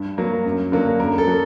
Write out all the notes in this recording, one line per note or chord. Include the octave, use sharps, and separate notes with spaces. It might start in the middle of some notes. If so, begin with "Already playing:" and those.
Already playing: G2
F#3 A#3
F#2
D3 F#3 A#3
F#2 A#4
A4
F#3